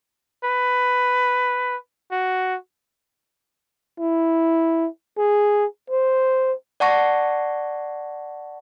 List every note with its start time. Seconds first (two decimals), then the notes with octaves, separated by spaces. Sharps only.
0.45 B4
2.12 F#4
4.00 E4
5.18 G#4
5.90 C5
6.80 D5 F#5 A5 C#6 A#6